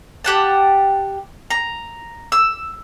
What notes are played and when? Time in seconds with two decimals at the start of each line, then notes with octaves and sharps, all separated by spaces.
0.24 G4 F#5 A5
1.50 A#5
2.32 E6